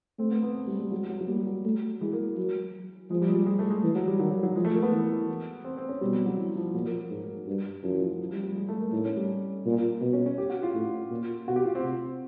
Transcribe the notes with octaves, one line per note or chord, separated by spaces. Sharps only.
A3 C4
B3
B3
A3
G3
G#3
G3
F#3 G#3
F#3
F#3
G3 A#3
F#3
A3
E3 G#3
A#3
F#3
F3 G#3
G3
G#3
G3
G#3
A3
G#3
E3
F#3
G3
D#3 F#3
F#3
F#3
F3 G#3
A3
A#3
B3
E3
C4
C4
C#4
B2 G3
F#3
F#3
E3
F3
A#2 F#3
A#3
G#2
G2
F#2 F3
E3
F3
F#3
F3
G3
G3
G#3
A3
A#3
A2 D#4
C#4
G3
A#2
B2
C#4
C#4
G4
F#4
F4
A2
A#2
B2 F#4
G4
F4
C4
C3